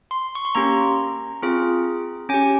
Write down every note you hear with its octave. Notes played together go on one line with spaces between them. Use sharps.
C6
C#6
C6
A#3 C#4 G4 A#5
C4 F4 G#4
C#4 G4 G#5